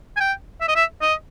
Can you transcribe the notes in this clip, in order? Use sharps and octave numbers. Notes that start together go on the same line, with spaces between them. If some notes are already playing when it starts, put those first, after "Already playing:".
G#5
G5
E5
D#5
E5
D#5